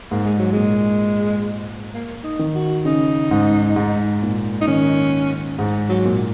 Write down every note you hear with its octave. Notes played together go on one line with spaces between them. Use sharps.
G#2 A#3
G#3
F#3
A#2 G#3
A#3
D#4
D#3
F#4
C#3 D#4
G#2
G#2
A#2
D#4
D#3 C#4
G#2
F#3
A#2